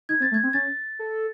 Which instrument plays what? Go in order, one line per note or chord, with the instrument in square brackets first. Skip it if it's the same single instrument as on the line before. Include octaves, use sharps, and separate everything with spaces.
[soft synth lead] D#4 [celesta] G#6
[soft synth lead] C4 [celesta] A6
[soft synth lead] A3
[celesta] G#6
[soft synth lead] C4
[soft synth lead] C#4 [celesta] A6
[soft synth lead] A4